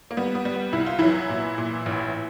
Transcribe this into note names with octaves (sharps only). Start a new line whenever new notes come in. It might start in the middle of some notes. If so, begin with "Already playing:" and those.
A#3
G3 B3
B3
G3
B3
C2 E4
F4
E3 F#3 E4
A#2
A#2
A1